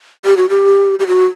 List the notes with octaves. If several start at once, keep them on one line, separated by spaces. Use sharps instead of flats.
G4
F#4
G4
G4
F#4